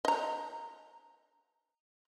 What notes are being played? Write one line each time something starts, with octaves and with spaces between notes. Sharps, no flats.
D#5 A#5